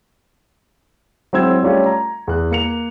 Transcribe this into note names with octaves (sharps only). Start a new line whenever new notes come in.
F#3 G#3 C4 E4 E6 G#6
G3 A3 C#4 F4 A4
A#5
E2 F#6
A#3 C#7 F7